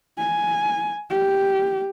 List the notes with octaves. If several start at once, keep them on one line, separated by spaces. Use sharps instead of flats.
G#5
G4